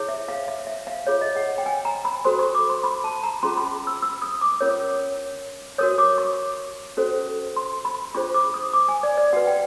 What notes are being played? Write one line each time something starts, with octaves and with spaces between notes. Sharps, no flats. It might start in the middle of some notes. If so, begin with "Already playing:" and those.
Already playing: E4 G#4 C#5
E5
F5
E5
E5
F5
F4 G#4 C#5
D#5
F#5
G5
G#5
A#5
B5
F#4 A4 C5 C6
C#6
D6
C6
B5
A5
A#5
C#4 F4 G#4 C6
B5
E6
E6
D#6
D6
C#4 F4 A#4 C#5
F#4 A#4 C#5 D#6
D6
C#6
C#4 F#4 A4 C5
C6
B5
D4 F4 G#4 C5 C#6
D6
D#6
D6
G#5
D5
D5
F#4 B4 F#5
G5